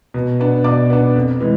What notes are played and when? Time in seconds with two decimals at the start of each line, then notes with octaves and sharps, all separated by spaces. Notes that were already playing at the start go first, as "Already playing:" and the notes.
0.14 B2
0.40 B3 D4
0.64 B2 D5 D6
0.90 B3 D4
1.16 F2
1.40 E3 G#3